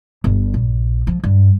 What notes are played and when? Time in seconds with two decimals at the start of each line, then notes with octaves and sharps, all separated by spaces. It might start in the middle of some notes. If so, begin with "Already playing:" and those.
0.24 G1
0.54 A#1
1.07 F3
1.24 G2